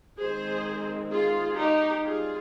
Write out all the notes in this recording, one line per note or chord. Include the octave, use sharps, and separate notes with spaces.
D#3 G#3 C4 G#4 C5
F4 G#4
D#4 G4
G3 C4 F4 G#4